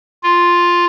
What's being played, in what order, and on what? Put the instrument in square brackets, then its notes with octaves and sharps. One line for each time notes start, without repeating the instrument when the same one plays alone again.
[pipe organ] F4